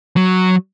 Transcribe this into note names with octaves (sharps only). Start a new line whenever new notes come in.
F#3